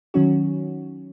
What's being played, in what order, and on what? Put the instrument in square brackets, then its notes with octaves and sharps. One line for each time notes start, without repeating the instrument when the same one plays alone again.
[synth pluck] D#3 F#3 C#4 F#4